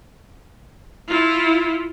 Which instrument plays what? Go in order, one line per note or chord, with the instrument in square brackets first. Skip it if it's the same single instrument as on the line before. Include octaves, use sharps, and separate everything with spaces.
[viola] E4 F4